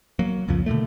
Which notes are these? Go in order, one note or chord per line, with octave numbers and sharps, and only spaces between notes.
F#3 A#3
C2 F2 C#3 F3
B2 D3 D#3 A3